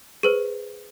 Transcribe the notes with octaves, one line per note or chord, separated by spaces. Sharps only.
G#4 B4 C5